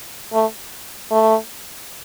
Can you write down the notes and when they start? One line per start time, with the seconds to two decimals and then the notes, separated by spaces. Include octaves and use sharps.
0.33 A3
1.11 A3